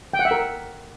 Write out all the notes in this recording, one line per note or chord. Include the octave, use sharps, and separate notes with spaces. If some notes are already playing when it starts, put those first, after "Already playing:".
G5
F#5
E5
A#4